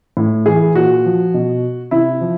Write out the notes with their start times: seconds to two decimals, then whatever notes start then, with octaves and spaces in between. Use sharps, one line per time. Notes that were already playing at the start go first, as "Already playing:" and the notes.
0.17 A2
0.46 E3 G#4
0.75 A#2 F#4
1.05 F3
1.34 B2
1.91 C3 E4
2.21 F3